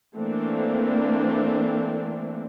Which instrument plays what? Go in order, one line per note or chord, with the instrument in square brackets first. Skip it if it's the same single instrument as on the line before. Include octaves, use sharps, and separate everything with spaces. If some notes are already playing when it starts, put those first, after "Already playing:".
[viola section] E3 A3 A#3 C4 D4